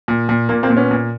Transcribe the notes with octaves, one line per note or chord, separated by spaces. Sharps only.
A#2
A#2
A#2 A#3
A#3 C4
A#2
B3 C#4
A#2